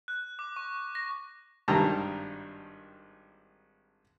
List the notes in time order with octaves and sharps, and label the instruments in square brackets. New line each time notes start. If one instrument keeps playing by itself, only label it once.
[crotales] F#6
D6
C#6
A#6
[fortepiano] G#1 G2 D#3 G3 A5 A#5